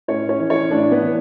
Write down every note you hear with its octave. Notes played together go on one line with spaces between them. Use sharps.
A2 C#4 C#5
C#4 C#5
E3
C#4 C#5
A2 D4 D5
B3 B4
E3